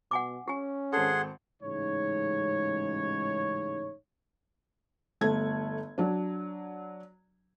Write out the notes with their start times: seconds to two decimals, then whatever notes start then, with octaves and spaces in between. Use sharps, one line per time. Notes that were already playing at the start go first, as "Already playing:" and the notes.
0.11 B2 F#5 G#5 D6
0.48 C#4 G4 G#5
0.93 G#1 C4 G#4 A4 F#5 C6
1.62 A1 G#2 C#3 G#3 D#4 C#5
5.21 G1 A3 G#6
5.98 F#3 D4